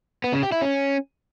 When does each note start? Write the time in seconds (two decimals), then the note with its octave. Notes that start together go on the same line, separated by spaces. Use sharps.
0.24 B3
0.33 C#3
0.43 G4
0.52 E4
0.61 C#4